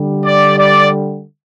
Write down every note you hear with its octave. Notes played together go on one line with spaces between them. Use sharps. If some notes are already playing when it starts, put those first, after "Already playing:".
Already playing: D3 G3
D5
D5